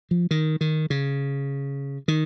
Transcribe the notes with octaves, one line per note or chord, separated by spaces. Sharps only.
F3
D#3
D#3
C#3
D#3